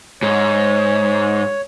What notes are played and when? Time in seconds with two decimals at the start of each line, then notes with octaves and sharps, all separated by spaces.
0.23 G#2 C#5